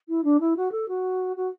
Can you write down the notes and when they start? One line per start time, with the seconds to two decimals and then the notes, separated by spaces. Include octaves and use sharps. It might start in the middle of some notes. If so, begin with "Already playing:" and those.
0.09 E4
0.24 D4
0.40 E4
0.57 F#4
0.72 A4
0.88 F#4
1.37 F#4